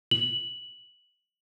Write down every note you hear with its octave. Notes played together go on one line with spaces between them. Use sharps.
F#7